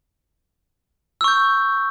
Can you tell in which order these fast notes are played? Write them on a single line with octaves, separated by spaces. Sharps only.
E6 C#6 G6